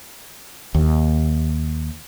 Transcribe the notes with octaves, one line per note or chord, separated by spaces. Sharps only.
D#2